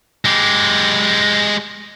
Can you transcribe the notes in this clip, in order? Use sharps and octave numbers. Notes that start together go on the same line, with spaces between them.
G#3 G4